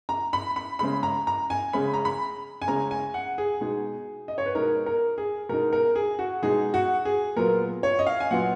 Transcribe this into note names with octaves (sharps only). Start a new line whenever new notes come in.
A#5
B5
B5
C#3 G#3 C#4 B5
A#5
A#5
G#5
C#3 G#3 C#4 B5
A#5
B5
G#5
C#3 G#3 C#4 A#5
G#5
F#5
G#4
B2 G#3 D#4 G#4
D#5
C#5
B4
B2 G#3 D#4 A#4
A#4
G#4
B2 G#3 D#4 A#4
A#4
G#4
F#4
B2 G#3 D#4 G#4
F#4
G#4
A#2 F#3 B3 F4 A#4
C#5
D#5
F5
G#5
A#2 F#3 B3 F4 F#5